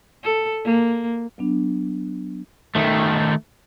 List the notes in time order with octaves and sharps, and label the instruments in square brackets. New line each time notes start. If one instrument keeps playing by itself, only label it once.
[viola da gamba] A4
A#3
[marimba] F#3 B3 D4
[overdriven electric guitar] D#3 A3